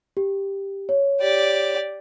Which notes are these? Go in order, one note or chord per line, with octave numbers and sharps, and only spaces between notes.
G4
C#5
G4 D5